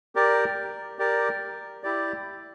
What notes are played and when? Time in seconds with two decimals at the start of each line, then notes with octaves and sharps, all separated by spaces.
0.15 G4 A#4 D5
0.99 G4 A#4 D5
1.83 E4 G4 D5